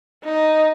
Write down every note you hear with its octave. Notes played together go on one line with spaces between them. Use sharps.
D#4